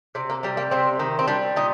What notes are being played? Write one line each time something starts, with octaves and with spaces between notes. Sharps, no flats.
C3 D4
A#3
G3 A#3
A#3
C3 C4
D#3
C4
G3 D4
A#2 D#4